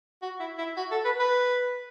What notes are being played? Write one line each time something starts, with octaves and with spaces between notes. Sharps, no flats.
F#4
E4
E4
F#4
A4
B4
B4